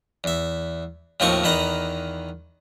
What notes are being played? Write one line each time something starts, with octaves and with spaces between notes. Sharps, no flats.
E2 E5
D#2 A2 F3 C4 D#5 C#6
E2 D#3 B4 D#5 A#5